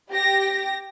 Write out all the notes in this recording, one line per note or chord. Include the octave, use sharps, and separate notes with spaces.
G4 A#6